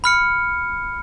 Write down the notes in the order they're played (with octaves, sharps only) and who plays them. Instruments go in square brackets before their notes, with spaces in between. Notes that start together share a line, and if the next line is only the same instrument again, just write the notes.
[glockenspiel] B5 F6 C#7